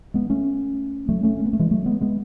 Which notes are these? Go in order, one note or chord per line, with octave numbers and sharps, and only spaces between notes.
G#3 B3
A3 C#4
F#3 A3
A3 C#4
C#4
B3
A3
E3 G#3
F#3 A3
G#3 B3
G#3 B3